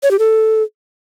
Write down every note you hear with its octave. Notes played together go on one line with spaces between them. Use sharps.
C#5
G4
A4